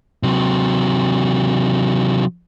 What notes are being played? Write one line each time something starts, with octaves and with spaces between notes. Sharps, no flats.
C3 F#3